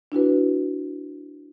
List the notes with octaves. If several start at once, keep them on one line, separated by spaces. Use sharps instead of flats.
D4 E4 F#4 B4